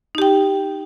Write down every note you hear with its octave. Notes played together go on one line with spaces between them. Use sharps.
D#4 G4 G5